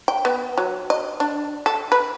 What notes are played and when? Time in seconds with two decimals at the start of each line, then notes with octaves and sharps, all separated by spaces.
0.08 G5
0.25 B3
0.58 F#3
0.90 D#5
1.20 D4
1.66 A4
1.92 B4